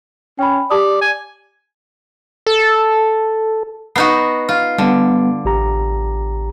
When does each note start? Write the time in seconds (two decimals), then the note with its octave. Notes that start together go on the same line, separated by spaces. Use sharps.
0.39 C#4 G5 B5
0.71 G4 D5 A5 D#6
1.01 G#5
2.47 A4
3.96 B3 D#4 F#4 C7
4.49 F4
4.78 D3 G3 B3
5.45 A1 G4 A#5